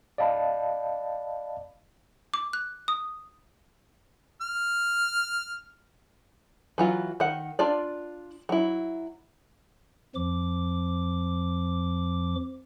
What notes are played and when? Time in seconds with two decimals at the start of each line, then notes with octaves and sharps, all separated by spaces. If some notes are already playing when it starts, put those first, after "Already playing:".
0.18 D5 D#5 F5 A5 B5
2.34 D6
2.53 F#6
2.88 D#6
4.42 F6
6.78 E3 F#3 F4
7.20 D#3 F#5
7.59 D4 F4 D5
8.49 F#3 E4
10.15 F2 F3 D6